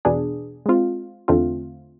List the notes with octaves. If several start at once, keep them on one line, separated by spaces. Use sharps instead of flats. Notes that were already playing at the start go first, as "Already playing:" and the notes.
E2 B2 B3 D4 G#4
G#3 C4 F4
E2 D3 A3 C4 F4